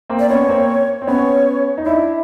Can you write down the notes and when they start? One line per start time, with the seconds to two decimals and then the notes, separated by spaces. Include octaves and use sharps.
0.10 A#3 C4
0.19 D5
0.29 B3 C#4 C#5
0.49 A#3 C4
1.02 C4
1.07 B3 C#4 C#5
1.78 D#4
1.86 D4 E4 E5